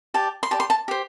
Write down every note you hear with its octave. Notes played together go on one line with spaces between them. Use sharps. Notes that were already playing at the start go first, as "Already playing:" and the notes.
G4 D5 A5
C6
G4 D5 A5
C6
A5
G4 C5